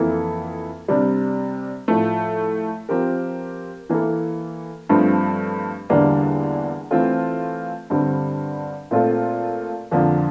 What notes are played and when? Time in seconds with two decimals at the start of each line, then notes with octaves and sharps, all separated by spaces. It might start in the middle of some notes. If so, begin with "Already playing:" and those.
Already playing: F2 E3 A#3 E4 A4
0.88 C3 G3 D4
1.88 A2 F3 A3
2.89 F3 C4 G4 A#4
3.89 E3 A#3 E4 A4
4.89 G2 F3 A3 C4
5.90 E2 D3 G3 A#3 D4
6.91 E3 A3 C4 F4 A4
7.90 G2 D3 G3 C4
8.91 A#2 A3 C4 F4 A4
9.91 F2 D3 F3 A#3 F4